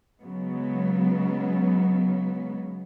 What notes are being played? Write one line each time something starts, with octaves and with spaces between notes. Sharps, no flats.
C#3 F#3 G#3 B3